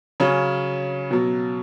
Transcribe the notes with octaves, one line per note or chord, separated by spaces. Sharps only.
C#3 F#3 C#4
B2 F#3